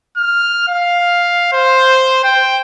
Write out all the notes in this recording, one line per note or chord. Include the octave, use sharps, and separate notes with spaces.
F6
F5
C5
G5